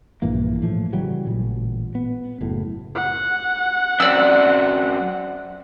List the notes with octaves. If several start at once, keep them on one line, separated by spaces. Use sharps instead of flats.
A#1 G2 E3 A#3
A2 E3 F3
C#3 E3 F#3 G3
A1 A#2
B3
F#1 A2
F#5
F#2 C4 D5 E6